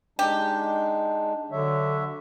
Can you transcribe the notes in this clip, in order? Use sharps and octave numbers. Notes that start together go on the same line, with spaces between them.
G#3 D4 D#4 G4
D3 F#3 C#5 E5